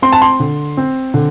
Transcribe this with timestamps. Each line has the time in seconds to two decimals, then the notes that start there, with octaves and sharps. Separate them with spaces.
0.02 C4 C6
0.12 A5
0.22 C6
0.40 D3
0.77 C4
1.14 D3